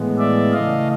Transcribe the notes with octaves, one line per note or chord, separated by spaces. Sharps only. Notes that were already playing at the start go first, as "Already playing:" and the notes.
Already playing: A2 E3 G#3 B3
D5 E5
C#3 E3 A3 D#5 F5